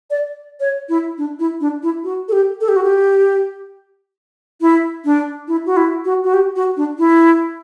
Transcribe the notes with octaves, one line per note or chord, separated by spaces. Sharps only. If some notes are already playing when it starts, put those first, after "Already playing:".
D5
C#5
E4
D4
E4
D4
E4
F#4
A4
G4
A4
G4
F#4
G4
E4
D4
E4
F#4
E4
F#4
F#4
G4
F#4
D4
E4